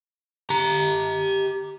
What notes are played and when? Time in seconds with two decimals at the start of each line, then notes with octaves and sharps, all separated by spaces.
0.50 G4 A#5